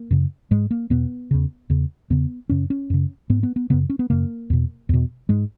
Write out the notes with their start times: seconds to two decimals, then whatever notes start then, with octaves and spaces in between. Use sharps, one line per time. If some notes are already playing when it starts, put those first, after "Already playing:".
Already playing: A#3
0.11 F#2 C#3
0.51 G#2 G#3
0.71 A#3
0.90 E2 B2 B3
1.31 E2 C#3
1.70 E2 C#3
2.10 E2 C#3 B3
2.50 F#2 C#3 C#4
2.70 C#4
2.90 F#2 C#3
3.30 G#2 B3
3.43 B3
3.56 B3
3.70 F#2 C#3 B3
3.90 C#4
3.99 B3
4.10 F#2 C#3 A#3
4.50 E2 B2
4.89 E2 B2
5.29 G#2 G#3